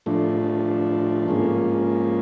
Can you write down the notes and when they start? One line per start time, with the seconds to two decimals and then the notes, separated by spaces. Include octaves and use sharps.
0.06 A2 F3 A3 D4
1.28 G#2 F3 A#3 C#4